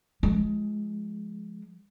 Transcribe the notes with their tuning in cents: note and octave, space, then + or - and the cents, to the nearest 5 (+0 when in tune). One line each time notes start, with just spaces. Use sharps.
F3 +0 G#3 +15